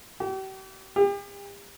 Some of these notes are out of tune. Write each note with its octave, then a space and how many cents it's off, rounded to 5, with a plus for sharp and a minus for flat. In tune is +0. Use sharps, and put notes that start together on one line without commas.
G4 -40
G4 +40